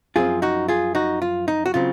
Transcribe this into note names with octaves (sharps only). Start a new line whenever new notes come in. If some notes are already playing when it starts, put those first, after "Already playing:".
F#2 F3 C4 F4 G#4
D#4 F#4
F4 G#4
D#4 F#4
F4
D#4
F#4
C#3 F#3 C4 F4